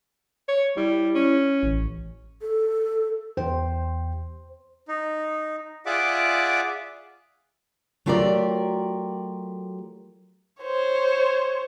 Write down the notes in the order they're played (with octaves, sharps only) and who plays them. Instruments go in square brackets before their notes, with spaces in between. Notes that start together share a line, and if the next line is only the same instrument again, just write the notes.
[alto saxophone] C#5
[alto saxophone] G3 [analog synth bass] E4
[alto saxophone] C#4
[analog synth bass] A1
[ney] A4
[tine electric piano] E2 G4 G5 [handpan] C5
[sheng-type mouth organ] D#4
F4 G#4 D5 E5 F#5 D6
[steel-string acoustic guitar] F#3 A3 F4 G4 A#4 D5
[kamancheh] C5 C#5